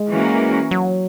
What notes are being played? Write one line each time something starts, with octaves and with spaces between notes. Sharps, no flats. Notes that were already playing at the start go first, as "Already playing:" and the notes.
Already playing: G#3
E3 A#3 C#4 F#4 A#4
F#3